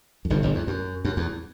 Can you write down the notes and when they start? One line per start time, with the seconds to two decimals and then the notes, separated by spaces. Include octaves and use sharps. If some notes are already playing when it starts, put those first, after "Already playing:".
0.25 F#2
0.30 G1 G2
0.42 G1 G2
0.55 E2
0.67 F#2
1.05 F#2
1.17 E2